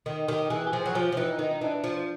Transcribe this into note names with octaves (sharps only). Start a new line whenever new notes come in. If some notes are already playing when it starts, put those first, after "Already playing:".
D#3
D#3 G4
E3 G#4
G4
F3 G#4
F#3
F3 G4
F3
E3 D#4
D#3 D#4
D#4
E3 D4
F3